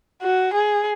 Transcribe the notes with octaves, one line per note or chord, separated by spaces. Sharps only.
F#4
G#4